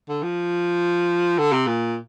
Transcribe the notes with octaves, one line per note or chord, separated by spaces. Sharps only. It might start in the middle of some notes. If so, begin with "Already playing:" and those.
D3
F3
D3
C3
A#2